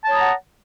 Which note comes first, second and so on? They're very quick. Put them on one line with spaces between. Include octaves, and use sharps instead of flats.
A5 C#5 D#6 A#5 F#5